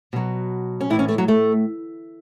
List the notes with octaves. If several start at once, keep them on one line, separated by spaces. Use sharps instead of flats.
B2 F#3
C#4
A2 E3 E4
C#4
A3
F#3
A3